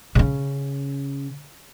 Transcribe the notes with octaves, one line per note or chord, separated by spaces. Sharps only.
C#3 C#4